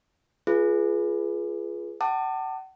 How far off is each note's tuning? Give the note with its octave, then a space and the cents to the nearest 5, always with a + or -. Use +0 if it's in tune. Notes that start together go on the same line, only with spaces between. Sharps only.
F4 -15 G#4 +15 B4 -20
F#5 +40 A5 +25 D6 +35